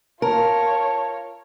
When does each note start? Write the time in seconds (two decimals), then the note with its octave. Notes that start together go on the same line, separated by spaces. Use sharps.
0.22 F4 A#4 C#5 A5